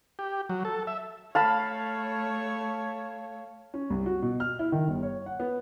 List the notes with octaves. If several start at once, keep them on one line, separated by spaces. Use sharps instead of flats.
G4
F#3
A4
E5
A3 C#5 F5 A5 B5
C#4
C2
F#4
B2
F6
E4
D#3
G1
C#5
F#5
B3